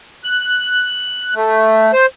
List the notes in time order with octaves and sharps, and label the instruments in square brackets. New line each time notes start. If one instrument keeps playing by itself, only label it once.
[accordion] F#6
A3
C5